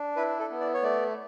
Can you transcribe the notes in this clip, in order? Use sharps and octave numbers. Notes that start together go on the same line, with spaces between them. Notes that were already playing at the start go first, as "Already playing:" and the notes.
Already playing: D4
E4 B4
A4
B3
D5
C#5
A3 D5